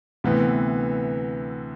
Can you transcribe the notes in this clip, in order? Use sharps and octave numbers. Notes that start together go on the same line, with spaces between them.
D2 C3 E3 B3